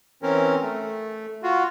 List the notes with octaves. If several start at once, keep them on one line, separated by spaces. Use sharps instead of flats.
E3 C4 C#4 A#4
A3
F4 F#4